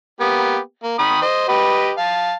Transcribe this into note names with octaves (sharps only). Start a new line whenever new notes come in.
A#3 B3 G4
A#3
D#3 B5 D#6
C5 D#5
G4 B4 D#5
F5 A5